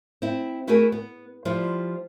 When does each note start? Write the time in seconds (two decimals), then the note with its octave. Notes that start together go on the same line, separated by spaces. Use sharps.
0.22 C4 E4
0.67 A3 E4 F#4 G#4 A#4 G#5
0.92 B3
1.45 F3 G3 E4 F4